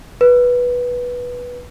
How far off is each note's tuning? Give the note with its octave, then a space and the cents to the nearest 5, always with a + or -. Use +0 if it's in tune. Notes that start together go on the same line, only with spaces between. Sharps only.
B4 -10